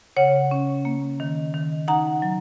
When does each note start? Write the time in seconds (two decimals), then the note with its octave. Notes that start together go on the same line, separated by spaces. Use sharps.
0.17 C#3 C#5 F#5
0.51 C#4
0.85 A#3
1.20 D#3
1.54 D#3
1.88 D#4 F#5 A#5
2.22 F#3